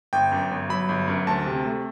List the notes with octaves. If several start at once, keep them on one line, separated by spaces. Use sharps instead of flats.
G1 G5
F#2
G1
F#3 B5
G1
F#2
D2 A5
C3
A3